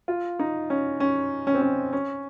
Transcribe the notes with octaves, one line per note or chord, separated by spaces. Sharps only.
F4
D#4
C#4
C#4
C#4
C4
C#4
C#4